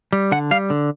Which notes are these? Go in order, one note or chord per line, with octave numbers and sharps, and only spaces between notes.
G3
D3 F#5
G3 F5
D3